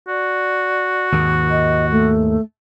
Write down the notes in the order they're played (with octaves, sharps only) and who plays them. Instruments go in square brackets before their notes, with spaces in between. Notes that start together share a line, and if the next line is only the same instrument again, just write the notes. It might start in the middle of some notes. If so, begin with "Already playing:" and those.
[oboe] F#4 [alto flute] D5
[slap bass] D#2 G#2 D#3
[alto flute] D#5
A3